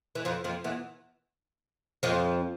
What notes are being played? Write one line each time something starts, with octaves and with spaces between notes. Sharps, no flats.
E3
F2 F3
F2 F3
E2 E3
F2 F3